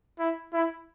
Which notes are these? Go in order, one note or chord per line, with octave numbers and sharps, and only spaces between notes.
E4
E4